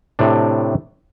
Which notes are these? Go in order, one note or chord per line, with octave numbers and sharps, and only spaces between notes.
A2 C3 D4